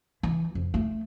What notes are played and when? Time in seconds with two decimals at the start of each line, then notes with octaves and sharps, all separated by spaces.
0.23 E3
0.55 F2
0.74 A3